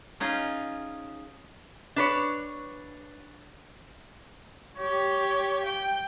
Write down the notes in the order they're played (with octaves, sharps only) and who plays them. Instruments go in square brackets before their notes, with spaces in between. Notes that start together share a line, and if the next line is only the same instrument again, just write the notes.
[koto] C#4 D#4 F4 G#4
[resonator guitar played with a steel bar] D4 B4 C#5
[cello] G4 C#5
G5